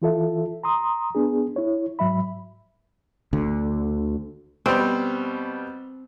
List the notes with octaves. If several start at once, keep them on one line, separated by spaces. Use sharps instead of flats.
E3 F4 A4 E5
A#5 C6 D#6
B3 D4 G#4
E4 C#5
G#2 F#3 E5 B5
D2 D3
B2 G3 C4